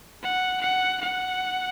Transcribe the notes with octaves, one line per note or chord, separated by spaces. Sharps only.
F#5
F#5
F#5